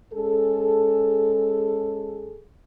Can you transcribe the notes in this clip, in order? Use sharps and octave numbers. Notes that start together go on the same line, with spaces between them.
G#3 C#4 G#4 A4